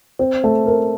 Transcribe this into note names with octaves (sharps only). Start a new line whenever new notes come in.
C4
A3
A#4